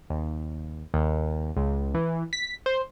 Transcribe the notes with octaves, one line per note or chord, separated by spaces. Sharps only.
D#2
D#2
C#2
E3
B6
C5